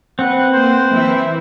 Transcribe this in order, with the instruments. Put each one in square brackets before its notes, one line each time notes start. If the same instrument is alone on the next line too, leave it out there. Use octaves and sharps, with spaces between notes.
[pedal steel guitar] C4 B4 [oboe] F#5
[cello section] A#3 [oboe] C5
[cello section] E3 E4